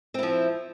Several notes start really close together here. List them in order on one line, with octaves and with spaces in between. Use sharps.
C4 E4 F3